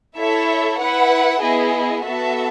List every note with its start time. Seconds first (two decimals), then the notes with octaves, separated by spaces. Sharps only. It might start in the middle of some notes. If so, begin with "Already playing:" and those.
0.17 E4 A4 C#5 E5
0.79 E4 B4 F#5
1.41 B3 E4 G#4 D#5
2.04 B3 F#4 A4 E5 A5